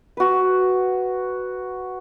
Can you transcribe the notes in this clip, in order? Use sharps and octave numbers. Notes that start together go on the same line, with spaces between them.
F#4 B4